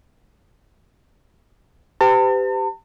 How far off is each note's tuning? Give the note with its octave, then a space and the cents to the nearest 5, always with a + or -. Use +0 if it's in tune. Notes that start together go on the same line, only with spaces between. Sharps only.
G4 +0 B4 +45 A5 +45